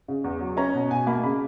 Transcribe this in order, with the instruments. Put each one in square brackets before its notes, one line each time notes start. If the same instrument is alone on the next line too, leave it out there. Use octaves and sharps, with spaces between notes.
[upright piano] C#3
E2
F#3
C#4 A#5
B2
B2 G#5
A#3 B5
C#3 B5